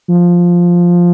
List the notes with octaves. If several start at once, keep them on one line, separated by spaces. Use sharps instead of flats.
F3